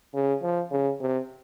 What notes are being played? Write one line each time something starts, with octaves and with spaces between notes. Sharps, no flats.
C#3
F3
C#3
C3